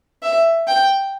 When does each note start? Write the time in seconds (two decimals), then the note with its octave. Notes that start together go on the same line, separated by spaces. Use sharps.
0.23 E5
0.67 G5